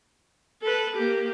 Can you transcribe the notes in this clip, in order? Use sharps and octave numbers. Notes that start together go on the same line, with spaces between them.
A4 B4
A#3 G4